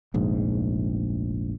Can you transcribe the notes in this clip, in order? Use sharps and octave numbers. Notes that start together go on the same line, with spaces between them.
F1 A#1 G#2